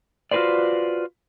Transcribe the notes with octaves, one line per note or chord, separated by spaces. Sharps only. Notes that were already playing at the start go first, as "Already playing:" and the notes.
F4 F#4 G#4 B4 C5 D5